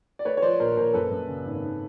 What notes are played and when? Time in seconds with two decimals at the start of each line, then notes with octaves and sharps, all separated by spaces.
0.19 D5
0.25 A3 B4 C#5
0.37 C#5
0.42 F3 C5 D5
0.60 A#1 A#4 C5
0.77 A#1 A#4 C5
0.94 F#2 A4 B4
1.11 F#2
1.28 C#3
1.46 G#1
1.62 D#3